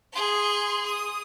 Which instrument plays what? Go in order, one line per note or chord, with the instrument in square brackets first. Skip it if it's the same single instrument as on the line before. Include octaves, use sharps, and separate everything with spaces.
[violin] G#4 C6
D#6